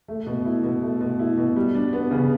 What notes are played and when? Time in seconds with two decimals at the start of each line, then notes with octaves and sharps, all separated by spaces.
0.08 A3
0.26 B2
0.45 E4
0.63 B2
0.82 A3
1.01 B2
1.19 E4
1.38 B2
1.56 G3
1.74 D4
1.93 B3
2.11 C#3